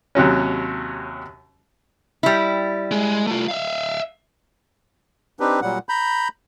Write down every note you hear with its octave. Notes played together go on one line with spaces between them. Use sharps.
D#2 C3 F#3 C#4
G3 E4
G#3
A3 F4
E5 F5
C4 D4 D#4 G4 B4
A#2 F#3 G3 F#5
A#5 B5 G6